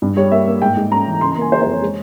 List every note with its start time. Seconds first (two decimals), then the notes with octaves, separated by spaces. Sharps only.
0.02 G2
0.17 G3 C#5
0.31 A#3 E5
0.47 A#3
0.62 G#2 G5
0.77 G#2
0.92 C#4 A#5
1.07 E3
1.21 C#3 C6
1.32 A#5
1.37 A#3 G#5
1.51 E3 C5
1.62 C5
1.66 F2
1.71 C#5
1.82 G#3